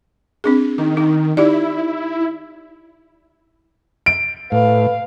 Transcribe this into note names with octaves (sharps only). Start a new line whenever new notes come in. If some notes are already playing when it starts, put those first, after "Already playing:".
C4 D4 G#4
D#3 D#4
D#3 D#4
D#4 E4 G4 D5
D7
A2 B4 F5